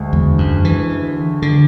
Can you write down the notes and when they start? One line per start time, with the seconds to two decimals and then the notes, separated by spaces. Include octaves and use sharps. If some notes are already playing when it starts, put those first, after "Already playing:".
Already playing: D2 G#3
0.13 E2
0.38 F#2
0.65 E3
1.42 D3